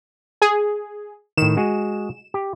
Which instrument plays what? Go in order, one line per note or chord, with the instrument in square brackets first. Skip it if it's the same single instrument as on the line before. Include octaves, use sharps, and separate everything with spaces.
[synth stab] G#4
[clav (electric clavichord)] A2 D#3 [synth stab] E7
[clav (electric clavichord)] G#3 F#4 G#4
G4